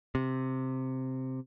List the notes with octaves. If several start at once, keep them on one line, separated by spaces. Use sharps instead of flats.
C3